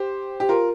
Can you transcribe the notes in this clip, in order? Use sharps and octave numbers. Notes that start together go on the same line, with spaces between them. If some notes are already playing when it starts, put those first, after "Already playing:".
Already playing: G4 C5
G4
F4 A#4